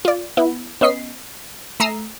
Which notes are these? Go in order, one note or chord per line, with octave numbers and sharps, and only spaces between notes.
F4 D5
B3 E4
B3 C#4 D#5 B6 C7
A3 A#5 D#6 E6 C7